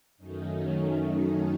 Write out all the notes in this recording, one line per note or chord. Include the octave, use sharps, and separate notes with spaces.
F#2 D#3 F#3 A3 C#4 D#4